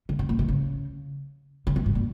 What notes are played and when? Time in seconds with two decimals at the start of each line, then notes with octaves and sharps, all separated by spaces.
0.09 C#3
0.19 C3
0.29 A#2
0.39 C3
0.48 C#3
1.67 C#3
1.76 C3
1.86 G#2
1.95 A#2